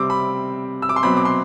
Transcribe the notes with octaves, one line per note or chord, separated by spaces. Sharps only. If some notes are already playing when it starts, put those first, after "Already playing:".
Already playing: C3 G3 C4 D6 E6
B5
E6
D6
C6
B2 F#3 C4 B5
D6
C6